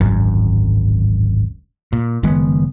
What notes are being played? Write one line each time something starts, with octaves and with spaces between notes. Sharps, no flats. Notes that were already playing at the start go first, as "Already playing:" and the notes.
D1 G#1 F#2
A#2
F#1 D#3 G#3 B3